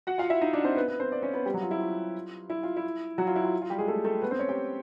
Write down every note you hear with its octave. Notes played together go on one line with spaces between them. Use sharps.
F#4 F#5
F4 F5
E4 E5
D#4 D#5
D4 D5
C4 C5
B3 B4
B3 B4
C4 C5
D5
C#4 C#5
B3 B4
G3 G4
F#3 F#4
F4
E4
F4
E4
F4
E4
F#3 F#4
F4
E4
F4
F4
G3 G4
G#3 G#4
A3 A4
A3 A4
B3 B4
C4 C5
C#4 C#5
G4 G5